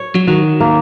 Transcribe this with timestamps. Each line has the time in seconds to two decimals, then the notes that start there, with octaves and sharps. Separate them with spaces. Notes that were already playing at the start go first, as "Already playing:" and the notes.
Already playing: C#5
0.15 F#3
0.27 D#3 F#4
0.60 A#3